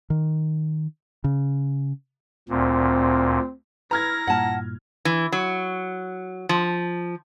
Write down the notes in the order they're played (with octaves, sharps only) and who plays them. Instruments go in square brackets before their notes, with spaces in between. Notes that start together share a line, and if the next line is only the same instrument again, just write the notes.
[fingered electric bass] D#3
C#3
[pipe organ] D2 A#2 [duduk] C4
[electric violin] E4 A#6 [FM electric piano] B4 [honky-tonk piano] A#5 F6 G#6
[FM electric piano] G2 A#2 [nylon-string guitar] F#5 A5
[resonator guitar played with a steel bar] E3
F#3
F3